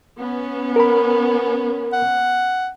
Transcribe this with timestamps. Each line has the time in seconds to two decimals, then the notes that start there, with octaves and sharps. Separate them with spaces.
0.19 B3 C#4
0.76 A#4 B5
1.93 F#5